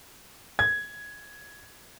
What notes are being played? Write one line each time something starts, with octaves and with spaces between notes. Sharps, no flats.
G#6